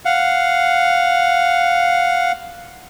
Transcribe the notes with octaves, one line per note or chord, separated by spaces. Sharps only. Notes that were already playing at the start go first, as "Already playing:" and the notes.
F5 F#5